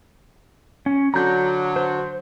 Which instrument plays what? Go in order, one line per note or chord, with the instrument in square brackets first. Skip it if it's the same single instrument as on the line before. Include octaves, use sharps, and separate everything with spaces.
[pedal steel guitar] C#4
[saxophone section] D3 F#3 [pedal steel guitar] A#5 G6
[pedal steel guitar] C5